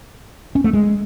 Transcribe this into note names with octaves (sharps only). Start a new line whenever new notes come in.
C#4
A3
G#3